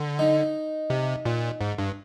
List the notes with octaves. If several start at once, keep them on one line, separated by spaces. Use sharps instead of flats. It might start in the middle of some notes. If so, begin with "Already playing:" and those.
Already playing: D3
D#4
C3
A#2
G#2
G2